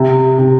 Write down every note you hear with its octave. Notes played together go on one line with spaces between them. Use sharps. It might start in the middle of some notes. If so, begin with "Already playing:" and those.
Already playing: C3
C3